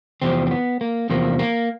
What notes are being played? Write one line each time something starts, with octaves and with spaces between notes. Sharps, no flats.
E2 C3 F3 C4
C4
B3
A#3
E2 C3 F3 A#3
A#3